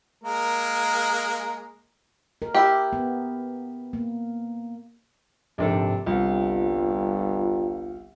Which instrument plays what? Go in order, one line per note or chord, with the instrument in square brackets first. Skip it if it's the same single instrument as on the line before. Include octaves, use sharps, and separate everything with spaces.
[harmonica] G#3 A#3 A#4
[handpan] A#4
[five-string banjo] E4 G4
[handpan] B3
A#3
[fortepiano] A#1 D4 A4 [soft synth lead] G#2 [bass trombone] C3
[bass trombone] G1 [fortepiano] C2 [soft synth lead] F4